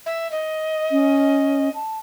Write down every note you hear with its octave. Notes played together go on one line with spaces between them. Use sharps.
E5
D#5
C#4
A5